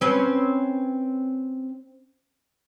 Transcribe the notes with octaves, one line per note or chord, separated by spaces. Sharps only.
C4 C#4 B4